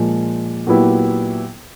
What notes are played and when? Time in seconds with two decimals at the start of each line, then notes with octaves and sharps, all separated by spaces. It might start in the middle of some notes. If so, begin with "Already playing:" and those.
Already playing: A#2 F3 G#3
0.67 A#2 F#3 B3 E4 G4